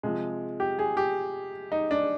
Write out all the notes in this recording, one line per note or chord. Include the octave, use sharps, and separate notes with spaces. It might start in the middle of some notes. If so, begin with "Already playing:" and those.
C3 F3 G#3
G4
G#4
G4
D#4
D4